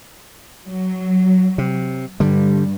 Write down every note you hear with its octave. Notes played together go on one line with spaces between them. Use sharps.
F#3
C3
G2 D3 G3